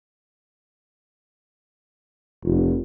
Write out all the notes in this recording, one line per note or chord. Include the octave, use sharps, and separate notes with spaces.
F1